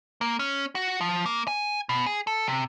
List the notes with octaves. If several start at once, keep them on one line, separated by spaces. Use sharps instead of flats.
A#3
C#4
F#4
F3
A#3
G#5
B2
G#4
A4
C3